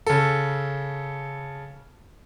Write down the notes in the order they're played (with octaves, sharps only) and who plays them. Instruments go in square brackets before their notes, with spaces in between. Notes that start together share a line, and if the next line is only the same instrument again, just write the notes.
[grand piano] C#3 A4